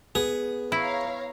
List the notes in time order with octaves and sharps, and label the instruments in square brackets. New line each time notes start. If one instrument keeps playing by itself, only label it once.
[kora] B3 [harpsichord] G#4
[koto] E4 [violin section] C#5 F5 A#5